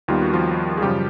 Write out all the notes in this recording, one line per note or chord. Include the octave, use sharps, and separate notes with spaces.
D#2 D#3 G3 B3 F4
F#4
F3 F4
G#4
F#2 C#3 F3 G3 G4